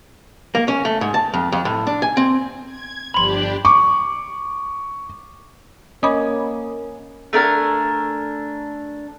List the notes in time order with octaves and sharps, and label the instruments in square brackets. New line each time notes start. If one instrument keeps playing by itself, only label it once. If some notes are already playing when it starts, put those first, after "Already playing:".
[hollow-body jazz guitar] A#3
C#4
A3
G#2
A5
F2
F2
A2
D4
G#5
C4
[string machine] G#6
[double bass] G1 F3 [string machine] D4 G4 [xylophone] B5 C6 [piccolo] F#7
[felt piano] C#6 D6
[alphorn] A#3 [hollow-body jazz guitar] C#4 [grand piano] D#5 [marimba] B5 D6 D#6
[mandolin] A3 D4 A#4 G#5